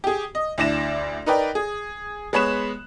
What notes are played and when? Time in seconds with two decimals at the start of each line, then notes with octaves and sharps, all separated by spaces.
0.04 G4 G#4
0.35 D#5
0.58 D2 D4 E4 D5 A#6 E7
1.26 D#4 A#4 B4 D5 G5
1.55 G#4
2.33 G#3 B3 C#5 B5 F#6 E7